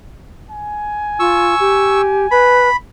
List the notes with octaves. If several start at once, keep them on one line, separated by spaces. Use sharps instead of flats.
G#5
F4 C#6 E6
G4
B4 B5